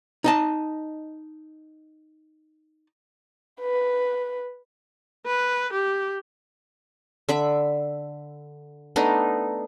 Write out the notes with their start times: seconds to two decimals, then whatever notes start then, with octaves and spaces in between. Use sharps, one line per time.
0.24 D#4 D#5 A5
3.61 B4
5.26 B4
5.73 G4
7.29 D3 E5 B5
8.96 A3 B3 D4 D#4